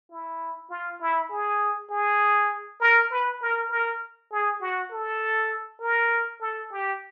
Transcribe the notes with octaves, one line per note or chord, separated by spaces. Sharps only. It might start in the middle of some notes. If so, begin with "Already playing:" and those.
E4
F4
E4
G#4
G#4
A#4
B4
A#4
A#4
G#4
F#4
A4
A#4
A4
G4